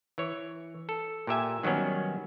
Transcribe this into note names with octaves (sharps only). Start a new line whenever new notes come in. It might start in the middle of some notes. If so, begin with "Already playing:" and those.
E3 C#5
A4
A#2 G4 E5 G#5
D#3 F#3 G3 B3 C#4